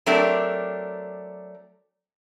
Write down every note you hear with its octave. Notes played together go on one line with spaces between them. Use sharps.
F#3 A3 C4 D4 G4 A#4